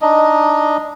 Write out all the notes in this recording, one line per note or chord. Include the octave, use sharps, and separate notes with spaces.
D4 D#4 D#5